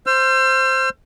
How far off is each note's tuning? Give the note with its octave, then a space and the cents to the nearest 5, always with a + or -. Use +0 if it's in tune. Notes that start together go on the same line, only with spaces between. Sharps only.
C5 +5 E6 +45